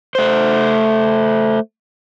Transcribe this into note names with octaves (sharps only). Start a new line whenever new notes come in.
A3 C5